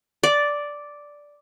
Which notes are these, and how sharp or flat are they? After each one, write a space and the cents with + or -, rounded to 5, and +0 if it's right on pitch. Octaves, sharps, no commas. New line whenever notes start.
D5 -5